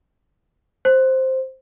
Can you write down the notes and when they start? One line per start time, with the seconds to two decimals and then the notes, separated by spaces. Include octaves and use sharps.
0.85 C5